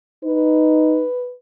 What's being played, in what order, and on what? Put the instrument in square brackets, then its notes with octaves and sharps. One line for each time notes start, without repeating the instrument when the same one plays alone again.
[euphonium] D#4 [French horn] B4